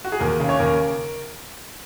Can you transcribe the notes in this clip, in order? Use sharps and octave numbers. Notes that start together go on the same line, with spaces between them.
F#4
G#4
D#2 A#4
C#3
C#5
D#2 A#4